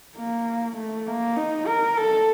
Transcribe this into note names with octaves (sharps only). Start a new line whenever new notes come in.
A#3
A3
A#3
D#4
A#4
A4